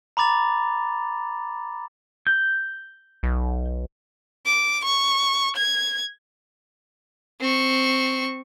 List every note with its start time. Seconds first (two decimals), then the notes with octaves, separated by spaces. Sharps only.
0.17 A#5 B5 D6 A6 F7
2.27 G6
3.23 B1
4.45 D6
4.84 C#6
5.56 G#6
7.41 C4 C#6